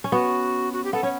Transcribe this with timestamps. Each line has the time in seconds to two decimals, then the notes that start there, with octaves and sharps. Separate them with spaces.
0.04 C#4
0.12 B3 F#4
0.73 F#4
0.84 G4
0.93 B3 A4
1.03 C#4 C#5